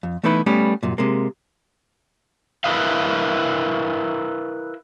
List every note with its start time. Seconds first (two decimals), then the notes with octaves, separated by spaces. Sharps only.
0.03 F2
0.23 E3 A3 B3 D#4 E4 B4
0.46 G3 A3 B3 C#4
0.83 C2 F#2 A#2
0.98 C3 G#3 A#3
2.64 E4 A#4 B4 D#5 F5